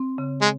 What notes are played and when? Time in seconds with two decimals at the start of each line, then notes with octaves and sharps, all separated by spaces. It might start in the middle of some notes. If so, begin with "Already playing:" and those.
Already playing: C4
0.18 C#3
0.41 G#3